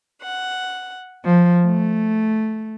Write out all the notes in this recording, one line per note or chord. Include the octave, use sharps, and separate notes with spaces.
F#5
F3
A3